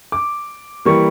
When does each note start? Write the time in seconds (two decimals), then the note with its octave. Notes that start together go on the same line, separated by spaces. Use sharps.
0.12 D6
0.85 E3 G3 A#3 C#6